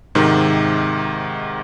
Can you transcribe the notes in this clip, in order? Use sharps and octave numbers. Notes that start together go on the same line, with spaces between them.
G#2 C3 D#3